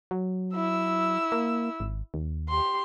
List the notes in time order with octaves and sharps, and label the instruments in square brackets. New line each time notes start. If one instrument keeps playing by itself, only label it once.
[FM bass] F#3
[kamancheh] E4 E6
[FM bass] A#3
G#1
D#2
[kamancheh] G4 C6